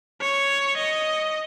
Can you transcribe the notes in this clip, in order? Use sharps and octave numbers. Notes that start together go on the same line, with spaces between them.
C#5
D#5